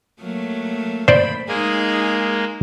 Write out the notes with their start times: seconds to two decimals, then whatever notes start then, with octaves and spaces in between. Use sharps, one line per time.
0.20 F#3 A3 A#3
1.08 C5 D5 B5
1.48 G#3 A#3 D#4 G#4